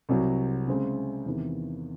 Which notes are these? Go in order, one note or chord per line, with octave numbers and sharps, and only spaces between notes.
C2 C3 F#3
C#3 G#3 C4
E2 C3 D#3